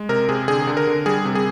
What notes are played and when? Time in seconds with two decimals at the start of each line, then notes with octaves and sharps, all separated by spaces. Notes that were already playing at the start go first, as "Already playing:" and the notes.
Already playing: G#3
0.09 C3 A#4
0.29 C3 G#4
0.48 D3 G#4
0.67 D3
0.77 A#4
0.87 D3
1.06 G3 G#4
1.25 C3
1.35 G#4